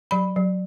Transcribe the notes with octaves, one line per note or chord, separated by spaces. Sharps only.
F#3 B5
F#3